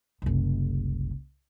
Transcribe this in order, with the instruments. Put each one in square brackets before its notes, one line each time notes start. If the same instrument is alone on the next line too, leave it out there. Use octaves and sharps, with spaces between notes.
[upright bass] F#1 C2